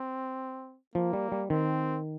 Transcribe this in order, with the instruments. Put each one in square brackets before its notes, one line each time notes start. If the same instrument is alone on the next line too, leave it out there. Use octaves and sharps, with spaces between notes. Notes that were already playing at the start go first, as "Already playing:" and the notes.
Already playing: [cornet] C4
[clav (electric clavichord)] F3 [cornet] A#3
[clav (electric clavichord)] G3
G3
[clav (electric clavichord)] D#3 [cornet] C4